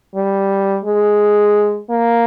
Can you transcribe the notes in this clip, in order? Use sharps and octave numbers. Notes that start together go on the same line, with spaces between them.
G3
G#3
A#3